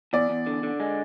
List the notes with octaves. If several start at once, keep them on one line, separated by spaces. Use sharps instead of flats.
E2 D5
E2
D3
D3
G#3